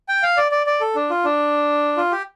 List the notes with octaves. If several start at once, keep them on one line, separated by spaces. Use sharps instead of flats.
G5
F5
D5
D5
D5
A4
D4
F4
D4
F4
G4